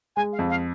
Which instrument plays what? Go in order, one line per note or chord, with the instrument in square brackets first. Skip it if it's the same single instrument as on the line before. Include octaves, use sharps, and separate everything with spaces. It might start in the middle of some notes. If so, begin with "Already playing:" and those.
[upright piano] G#3 [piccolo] G#5
[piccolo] F5
[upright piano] F2
[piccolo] F5